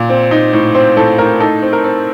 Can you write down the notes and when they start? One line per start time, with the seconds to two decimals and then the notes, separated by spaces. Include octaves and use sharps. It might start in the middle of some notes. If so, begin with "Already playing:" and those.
Already playing: A#2
0.09 C4
0.31 D#4
0.53 A2
0.75 C4 C5
0.97 A2 A4
1.19 A2 A#4
1.40 D#4 A4
1.62 C4
1.73 A#4
1.84 C4